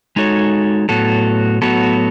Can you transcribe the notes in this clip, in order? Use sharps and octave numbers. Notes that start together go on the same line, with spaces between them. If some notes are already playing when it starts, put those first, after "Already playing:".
G#3 D#4 F#4 A4 C#5
A2 F#3 B3 F#4 A4
A2 F#3 B3 F#4 A4